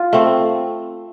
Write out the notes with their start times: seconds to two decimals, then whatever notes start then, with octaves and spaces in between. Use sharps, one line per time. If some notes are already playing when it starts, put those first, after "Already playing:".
Already playing: F4
0.13 A3 C4